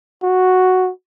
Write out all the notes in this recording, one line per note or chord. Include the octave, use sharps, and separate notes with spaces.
F#4